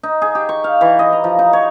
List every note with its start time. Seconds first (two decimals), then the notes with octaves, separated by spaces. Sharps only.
0.03 D#4
0.22 G#4
0.35 G4
0.49 C#6
0.64 F5
0.81 E3
0.99 D#5
1.13 A#5
1.24 F3
1.39 D#4
1.53 C#5